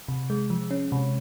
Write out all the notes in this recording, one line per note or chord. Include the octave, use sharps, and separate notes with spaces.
C3
G#3
F3
C#4
C3